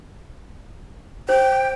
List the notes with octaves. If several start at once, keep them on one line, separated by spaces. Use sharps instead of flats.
C5 G5